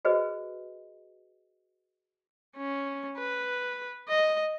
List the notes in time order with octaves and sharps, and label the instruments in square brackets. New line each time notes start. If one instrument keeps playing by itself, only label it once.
[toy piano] F#4 G#4 B4 C5 D#5
[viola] C#4
B4
D#5